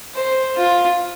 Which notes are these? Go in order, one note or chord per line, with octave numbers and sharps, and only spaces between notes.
C5
F4